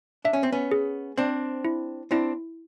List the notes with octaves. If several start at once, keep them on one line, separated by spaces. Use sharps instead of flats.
D4 E5
C#4
C4
B3 C#4
G#4
C4 D4 C5
E4
C4 D4 E4